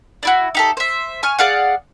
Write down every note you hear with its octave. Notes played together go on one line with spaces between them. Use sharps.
D4 E4 F#4
D#4 G4 A4
C5 E5
G#5 C#6 F6
G#4 D5 F5 F#5